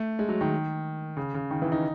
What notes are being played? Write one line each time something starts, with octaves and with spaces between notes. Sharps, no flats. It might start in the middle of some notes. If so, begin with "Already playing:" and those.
Already playing: A3
G#3
F#3
D#3
C#3
C#3
D#3
E3
D#4